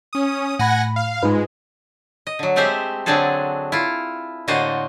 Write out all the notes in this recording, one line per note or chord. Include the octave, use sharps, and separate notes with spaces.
C#4 D#6
A2 F#5 G#5 B5 A#6
F5
G#2 G#3 D#4 F4 B4
D#5
D3 F#3
G#3 A3 C4 G4 C5 E5
D3 F#3 C4 D4 G#4 A4
E4 F4
A2 D3 A#3 F#4 C5 D#5